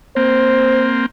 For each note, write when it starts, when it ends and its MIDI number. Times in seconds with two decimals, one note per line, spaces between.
0.16 1.06 58
0.16 1.06 60
0.16 0.89 72